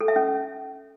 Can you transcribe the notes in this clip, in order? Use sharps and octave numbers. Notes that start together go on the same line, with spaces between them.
A4
E5
C#4